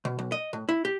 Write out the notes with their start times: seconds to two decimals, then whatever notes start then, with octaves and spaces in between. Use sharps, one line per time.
0.05 B2
0.19 B1
0.32 D#5
0.53 A2
0.69 E4
0.85 G4